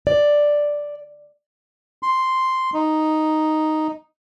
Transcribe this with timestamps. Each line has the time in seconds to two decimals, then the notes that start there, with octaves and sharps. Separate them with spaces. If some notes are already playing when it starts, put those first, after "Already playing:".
0.07 D5
2.03 C6
2.74 D#4